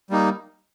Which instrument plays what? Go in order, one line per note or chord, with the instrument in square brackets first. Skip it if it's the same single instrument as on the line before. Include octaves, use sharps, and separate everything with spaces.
[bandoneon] G3 A#3 D#4